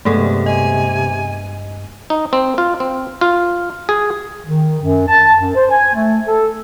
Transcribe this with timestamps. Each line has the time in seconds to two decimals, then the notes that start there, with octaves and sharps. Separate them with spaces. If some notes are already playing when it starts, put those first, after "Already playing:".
0.05 G2 C3 G#3 A3 B3 G#4 A4
0.46 D#5 G#5
2.10 D#4
2.33 C4
2.58 F4
2.80 C4
3.21 F4
3.89 G#4
4.47 D#3
4.83 F#2
5.07 A5
5.41 F#2
5.55 C5
5.70 G#5
5.95 A3
6.27 A4